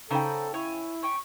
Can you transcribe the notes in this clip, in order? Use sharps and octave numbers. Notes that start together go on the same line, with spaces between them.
C#3 D#4 A4 C5 G5 B5
E4 C#5 G#5 C#6
C#4 G5 C#6